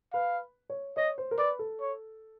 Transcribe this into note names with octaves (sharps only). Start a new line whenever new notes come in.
B4 F5
C#5
C#5 D#5
C5
A#4
B4 D5
A4
C#5